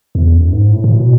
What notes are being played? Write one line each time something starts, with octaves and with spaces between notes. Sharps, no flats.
E2
F#2
G#2
A2
A2
B2